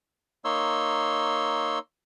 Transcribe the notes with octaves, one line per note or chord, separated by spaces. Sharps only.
A#3 D#4 C#5 C6 E6